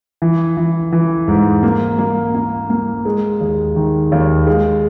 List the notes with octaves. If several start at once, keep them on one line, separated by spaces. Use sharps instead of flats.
E3
E3
E3
G#2
A#3
A#3
A#3
A#3
G#3
D#2
D#3
D#2
G#3